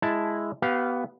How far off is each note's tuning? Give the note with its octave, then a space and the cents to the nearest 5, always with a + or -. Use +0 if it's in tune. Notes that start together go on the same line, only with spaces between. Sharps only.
G#3 +0 E4 +5 A5 +0
B3 +0 G4 -30 F5 -5